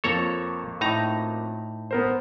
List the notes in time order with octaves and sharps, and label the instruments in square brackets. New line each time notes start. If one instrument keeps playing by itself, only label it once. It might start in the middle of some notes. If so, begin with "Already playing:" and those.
[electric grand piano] F2 A#3 C#6 [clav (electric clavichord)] A4 C#5 A#5
[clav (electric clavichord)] A2 D#4 A#5
[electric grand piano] B3 A#4 C5